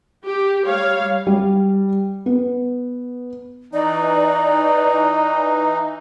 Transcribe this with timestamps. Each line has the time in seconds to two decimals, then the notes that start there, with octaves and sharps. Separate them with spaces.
0.25 G4
0.67 G3 C#5 F5
1.27 G3
2.26 B3
3.73 E3 D#4 D5